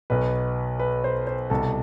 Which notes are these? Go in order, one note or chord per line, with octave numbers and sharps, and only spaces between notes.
B1 B2 B4
B4
C5
C5
C2 B2 A4